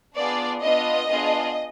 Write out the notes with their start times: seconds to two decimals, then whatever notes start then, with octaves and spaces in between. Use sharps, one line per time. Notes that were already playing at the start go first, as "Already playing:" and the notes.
0.15 B3 D4 F4 G#4 D5
0.62 B3 D4 F4 D#5
1.09 B3 D4 F4 G#4